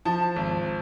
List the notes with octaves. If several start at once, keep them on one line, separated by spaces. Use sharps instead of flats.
F3 A5
G#1